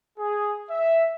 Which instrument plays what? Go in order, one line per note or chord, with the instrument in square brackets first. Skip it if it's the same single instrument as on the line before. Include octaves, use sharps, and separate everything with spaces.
[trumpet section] G#4
E5